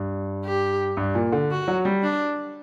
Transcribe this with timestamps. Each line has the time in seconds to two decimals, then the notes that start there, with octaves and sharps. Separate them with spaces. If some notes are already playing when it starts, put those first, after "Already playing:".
Already playing: G2
0.45 G4
0.97 G2
1.15 A#2
1.32 D3
1.51 F#4
1.68 F#3
1.85 G3
2.03 D4